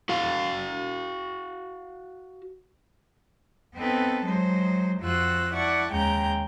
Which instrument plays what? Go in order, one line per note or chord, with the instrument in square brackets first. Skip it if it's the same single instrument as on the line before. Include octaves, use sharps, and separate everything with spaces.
[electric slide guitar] F#4 F5
[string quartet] B3 C4 D#4 A4 B4
F#3 G#3 D#4 C5
F2 F4 F#4 C5 E6 F#6
E4 D5 F#5 A5 C#6
D#2 C#3 G#3 G5 A#5 G6